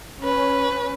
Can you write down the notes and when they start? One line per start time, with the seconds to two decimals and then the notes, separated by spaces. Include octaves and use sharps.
0.24 C#4 B4